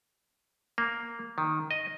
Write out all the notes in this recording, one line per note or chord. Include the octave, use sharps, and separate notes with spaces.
A#3
D#3
D#5